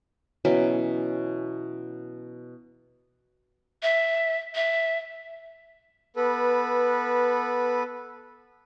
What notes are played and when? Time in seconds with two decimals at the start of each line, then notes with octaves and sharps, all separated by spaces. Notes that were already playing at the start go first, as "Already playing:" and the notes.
0.45 B2 E3 F#3 C#4
3.82 E5
4.55 E5
6.16 B3 A4 B4